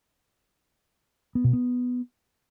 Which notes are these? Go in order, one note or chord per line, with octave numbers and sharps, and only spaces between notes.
B3
B2
B3